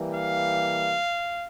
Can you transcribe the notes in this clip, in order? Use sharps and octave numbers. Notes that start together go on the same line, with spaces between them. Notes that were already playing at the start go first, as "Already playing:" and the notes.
Already playing: E3 G3 A#3
F5